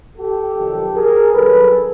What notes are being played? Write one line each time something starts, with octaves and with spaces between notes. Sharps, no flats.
G4 A4
F2 C3 D#3 F#3
G#4 A#4
G2 D#3 F#3 A4 B4